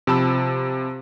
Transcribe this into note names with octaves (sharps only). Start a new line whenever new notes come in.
C3 F3 A5 B5 E6